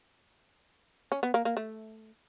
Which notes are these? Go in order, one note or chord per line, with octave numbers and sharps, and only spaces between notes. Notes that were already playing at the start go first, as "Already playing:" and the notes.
C#4
B3
A#3
A#3
A3